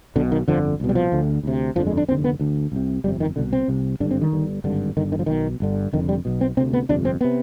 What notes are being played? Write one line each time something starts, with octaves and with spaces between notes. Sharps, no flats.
B1 B2 D3
D#3
G1 F2 D3 F3
C2 B2
G3
F3
D2 D3
D2 C3
G1 F2 D3 F3
G#3
D4
F1 D#2 D3 C4
B3
D2 D3
C2 C3
G1 F2 C3 G3
D#3
C2 B2 D3
C4
C2 C3
G#1 G2 D3 D4
C4
D#3
G1 G2 D3
G#1 G2 D3
G1 G2 D3 D#3
D#3
F3
B1 B2 D#3
G1 G2 D3
F1 F2 D3 D#3
G3
B1 B2
C4
D2 C3 C4
B3
G1 F2 C3 D4
C4
C3 B3